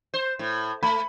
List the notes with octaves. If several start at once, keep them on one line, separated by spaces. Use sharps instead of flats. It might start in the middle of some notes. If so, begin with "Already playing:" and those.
C5
A2
A3 B5